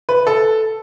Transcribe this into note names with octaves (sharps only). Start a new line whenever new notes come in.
B4
A4